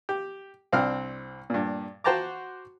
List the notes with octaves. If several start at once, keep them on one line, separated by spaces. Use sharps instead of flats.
G4
C2 C4 D4 F6
G2 A#2
F#4 C5 G5 A5 A#5 D6